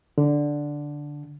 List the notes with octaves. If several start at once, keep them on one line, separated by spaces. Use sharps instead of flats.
D3